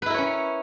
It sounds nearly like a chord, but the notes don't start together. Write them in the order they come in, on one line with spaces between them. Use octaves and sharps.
B4 E4 A#4 C#5 C#4